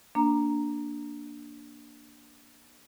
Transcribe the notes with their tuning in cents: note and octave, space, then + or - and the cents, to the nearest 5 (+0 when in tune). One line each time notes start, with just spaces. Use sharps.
A#3 +0 D4 +0 A#5 +0